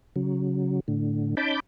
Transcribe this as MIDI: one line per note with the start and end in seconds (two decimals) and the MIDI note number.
0.16 0.80 49
0.16 0.80 54
0.88 1.35 45
0.88 1.35 50
1.37 1.60 61
1.37 1.60 63
1.37 1.60 81
1.37 1.60 83
1.37 1.60 86
1.37 1.60 91